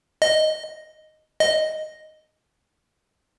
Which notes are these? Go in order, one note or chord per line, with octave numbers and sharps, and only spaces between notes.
D#5
D#5